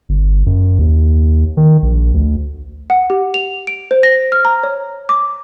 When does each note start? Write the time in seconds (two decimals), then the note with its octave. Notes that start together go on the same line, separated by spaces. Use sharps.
0.09 G1
0.46 F#2
0.79 D#2
1.57 D#3
1.82 A#1
2.14 D2
2.90 F#5
3.10 G4
3.34 F7
3.67 D7
3.91 C5
4.03 A#6
4.32 F6
4.45 A#5
4.63 C#5
5.09 D6